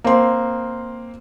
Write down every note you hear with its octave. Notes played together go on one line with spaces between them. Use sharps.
A#3 C4 C6